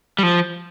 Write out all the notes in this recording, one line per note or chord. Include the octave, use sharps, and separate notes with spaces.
G3
F3